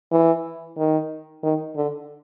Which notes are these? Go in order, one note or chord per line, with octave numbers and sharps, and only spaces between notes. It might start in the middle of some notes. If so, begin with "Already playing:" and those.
E3
D#3
D#3
D3